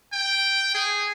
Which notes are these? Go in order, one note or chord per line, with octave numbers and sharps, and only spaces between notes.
G5
G#4